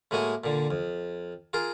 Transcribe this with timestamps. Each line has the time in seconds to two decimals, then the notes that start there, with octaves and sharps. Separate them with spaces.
0.11 A2 G#3 A#3 F#4 D#5 G#5
0.44 A#2 D3
0.71 F2
1.53 F4 G#4 A#4